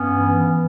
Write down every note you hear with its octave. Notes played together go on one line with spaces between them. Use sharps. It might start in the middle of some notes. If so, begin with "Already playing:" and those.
Already playing: G2 B3 C#4
E3
E3